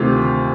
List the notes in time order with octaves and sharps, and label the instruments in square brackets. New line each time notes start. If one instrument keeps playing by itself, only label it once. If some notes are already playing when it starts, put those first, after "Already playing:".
Already playing: [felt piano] D2 C3 D#3 F4